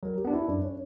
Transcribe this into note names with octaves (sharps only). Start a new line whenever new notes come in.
F#3 A#4
G4
B3 D4
E4
F#2 D4
C#4